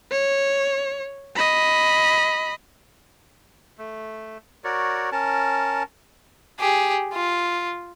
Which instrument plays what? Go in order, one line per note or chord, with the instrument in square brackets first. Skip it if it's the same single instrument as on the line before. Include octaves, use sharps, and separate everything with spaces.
[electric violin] C#5
D#5 B5
[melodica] A3
F#4 A#4 C#5 D5
C#4 A#4 A5
[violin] G4 G#4
F4